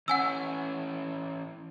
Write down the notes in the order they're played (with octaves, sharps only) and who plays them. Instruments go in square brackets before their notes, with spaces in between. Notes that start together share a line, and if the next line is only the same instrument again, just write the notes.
[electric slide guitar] E3 C#4 [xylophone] F#5 G#5 E6